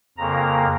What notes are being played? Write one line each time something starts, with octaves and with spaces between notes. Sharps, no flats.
F2 C#3 A#3 A#5